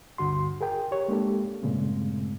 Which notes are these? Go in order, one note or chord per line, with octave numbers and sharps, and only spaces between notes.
C#2 G2 D3 F#4 C6
G#4 A#4 G5
G4 C#5
G#3 A#3 D4 G4 A4
G2 A#2 C#3 G#3 A3 C4